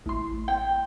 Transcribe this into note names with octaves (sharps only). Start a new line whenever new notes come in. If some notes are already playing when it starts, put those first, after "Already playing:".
A1 C6
G5